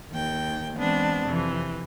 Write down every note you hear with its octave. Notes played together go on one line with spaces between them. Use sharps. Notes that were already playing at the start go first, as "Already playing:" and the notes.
D#2 G5
E3 G#3 B3 C4 D4
F2 C3 E3